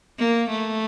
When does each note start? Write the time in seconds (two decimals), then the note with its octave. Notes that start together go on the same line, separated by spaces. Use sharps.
0.18 A#3
0.50 A3